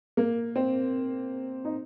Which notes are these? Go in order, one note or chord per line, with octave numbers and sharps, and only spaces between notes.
A#3
C4
D#4